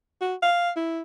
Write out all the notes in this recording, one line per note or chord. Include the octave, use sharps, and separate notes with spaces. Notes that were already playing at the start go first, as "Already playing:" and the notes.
F#4
F5
E4